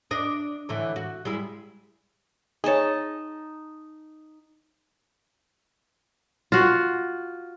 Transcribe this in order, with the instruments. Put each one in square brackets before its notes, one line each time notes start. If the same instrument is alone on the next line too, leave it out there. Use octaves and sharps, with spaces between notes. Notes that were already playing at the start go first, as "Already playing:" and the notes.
[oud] D4 D#5
A2 D3 E3
F#4
G3 G#3 E4
[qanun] D#4 D#5 A5 [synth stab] G#4 C#5
[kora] F4 F#4